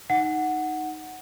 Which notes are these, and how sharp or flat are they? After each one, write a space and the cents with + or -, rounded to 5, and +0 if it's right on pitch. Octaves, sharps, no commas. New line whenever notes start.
D#4 +0 F#5 +0